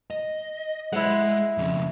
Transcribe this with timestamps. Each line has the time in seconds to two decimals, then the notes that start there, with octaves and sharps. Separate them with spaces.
0.11 D#5
0.93 G#3 E4 F#5
1.57 F2 C#3